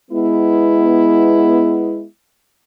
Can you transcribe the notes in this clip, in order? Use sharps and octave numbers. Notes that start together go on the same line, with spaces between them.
G#3 B3 E4